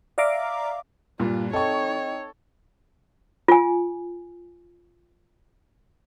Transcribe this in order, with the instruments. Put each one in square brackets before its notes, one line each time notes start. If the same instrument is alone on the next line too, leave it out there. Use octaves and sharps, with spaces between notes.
[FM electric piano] D5 E5 F5 A#5 D6
[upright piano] G2 A#2 [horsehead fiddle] F4
[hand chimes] C4 D#5 G5 [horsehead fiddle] D#4 C#5 [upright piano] A4 C#6
[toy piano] F4 G#5